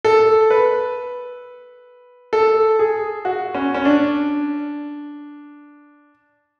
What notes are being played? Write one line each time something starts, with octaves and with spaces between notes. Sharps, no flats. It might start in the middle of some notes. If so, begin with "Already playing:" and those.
A4
B4
A4
G#4
F#4
C#4
C#4
D4